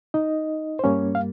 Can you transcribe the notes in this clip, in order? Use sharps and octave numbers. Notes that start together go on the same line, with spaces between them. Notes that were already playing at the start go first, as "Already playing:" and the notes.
D#4 D#5
C5
G2 G3 A#3 C#4 C#5
F5